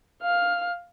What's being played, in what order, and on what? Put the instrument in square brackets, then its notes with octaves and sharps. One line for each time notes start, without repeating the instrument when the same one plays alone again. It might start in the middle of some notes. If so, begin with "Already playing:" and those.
[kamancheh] F5 F6